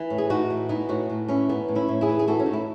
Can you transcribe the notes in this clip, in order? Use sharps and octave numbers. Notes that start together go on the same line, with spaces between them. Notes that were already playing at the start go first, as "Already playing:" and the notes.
Already playing: E3
A2
G#4
A2 D#4 F#4
E3
E3 B3 D#4
A2 D#4 F#4
A2
E3 C#4 E4
E3 B3 D#4
A2
C#4 E4
A2
E4 G#4
E3
G#4
E3 F#4 A4
C#4
A2 D#4
E4